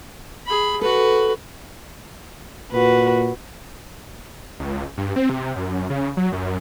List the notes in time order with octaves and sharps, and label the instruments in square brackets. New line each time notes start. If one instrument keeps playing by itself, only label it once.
[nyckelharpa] G#4 B5
[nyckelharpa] F#4 B4 [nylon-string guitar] A4
[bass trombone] A#2 [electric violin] F#4 B4
[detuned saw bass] C#2
G2
C4
C3
F#2
C#3
F#3
F#2